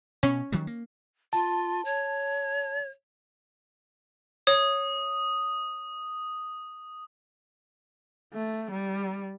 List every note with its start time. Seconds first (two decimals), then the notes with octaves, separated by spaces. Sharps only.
0.23 B2 C#4
0.52 D#3 F#3 G3
0.67 A#3
1.33 F4 A5
1.85 C#5
4.47 C#5 D#6
8.34 A3
8.71 G3